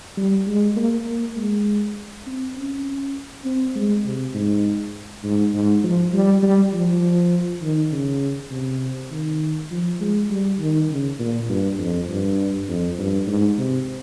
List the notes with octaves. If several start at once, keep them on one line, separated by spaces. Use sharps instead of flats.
G3
G#3
A#3
A#3
G#3
C4
C#4
C4
G#3
C3
G#2
G#2
G#2
F3
G3
G3
F3
D#3
C#3
C3
D#3
F3
G#3
G3
D#3
C#3
A#2
G2
F2
G2
F2
G2
G#2
C3